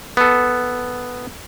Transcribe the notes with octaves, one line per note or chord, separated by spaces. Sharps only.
B3 A4